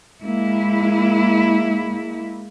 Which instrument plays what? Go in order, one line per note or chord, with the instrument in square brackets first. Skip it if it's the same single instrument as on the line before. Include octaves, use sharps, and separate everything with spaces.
[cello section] G#3 A#3 E4